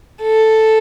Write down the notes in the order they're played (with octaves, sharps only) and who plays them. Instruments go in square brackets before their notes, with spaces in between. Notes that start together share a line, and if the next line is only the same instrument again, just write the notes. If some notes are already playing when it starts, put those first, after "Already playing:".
[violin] A4